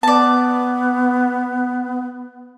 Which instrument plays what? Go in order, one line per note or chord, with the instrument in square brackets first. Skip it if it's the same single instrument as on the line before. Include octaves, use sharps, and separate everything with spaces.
[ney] B3 [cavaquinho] D5 A5